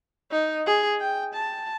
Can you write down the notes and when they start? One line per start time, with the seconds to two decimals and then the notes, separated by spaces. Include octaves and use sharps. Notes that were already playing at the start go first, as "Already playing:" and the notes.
0.31 D#4
0.66 G#4
1.00 G5
1.34 A5